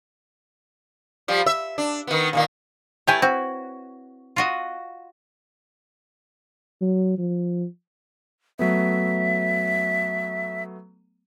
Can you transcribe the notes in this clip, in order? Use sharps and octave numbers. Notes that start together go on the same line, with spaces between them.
F3 G3
E5
D4
D#3 B3
A#2 D#3 A#3
A3 E4 G4 B4 C#5 G#5
C4 F#4
F4 F#4 D#5
F#3
F3
F#3 A3 B3 E5